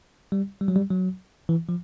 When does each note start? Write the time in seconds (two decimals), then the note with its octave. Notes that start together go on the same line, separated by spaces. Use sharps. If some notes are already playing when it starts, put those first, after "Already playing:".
0.32 G3
0.61 G3
0.68 F#3
0.76 G3
0.90 F#3
1.49 E3
1.69 F3